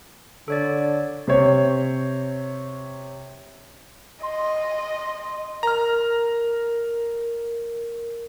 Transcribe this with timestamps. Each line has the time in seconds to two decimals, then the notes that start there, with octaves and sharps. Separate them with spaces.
0.48 D3 A4 C#5 D5
1.27 C3 C5 C#5
4.23 D#5 C6
5.63 A#4 A#5 F6